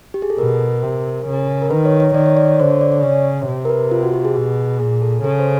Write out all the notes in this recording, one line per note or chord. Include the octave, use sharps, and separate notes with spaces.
G4
G#4
A4
B2 A#4
C3
C#3
A#4
D#3 B4
C#5
C#5
D#3 D5
C#5
D5
C#5
D3 C5
C#5
D5
D5
C#3 C#5
C3
A#4
B4
F4
F#4
G4
G#4
B2
A#2 G#4
A4
C#3 A4
C5